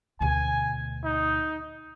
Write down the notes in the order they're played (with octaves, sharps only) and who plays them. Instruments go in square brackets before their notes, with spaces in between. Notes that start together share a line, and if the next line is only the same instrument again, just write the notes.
[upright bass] D2 B2 [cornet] G#5
[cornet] D#4